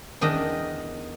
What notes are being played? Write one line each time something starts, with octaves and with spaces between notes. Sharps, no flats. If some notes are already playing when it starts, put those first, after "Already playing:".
E2 D#3 D4 D#5